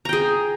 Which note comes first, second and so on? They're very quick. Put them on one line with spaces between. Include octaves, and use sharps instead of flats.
A#5 G5 G#4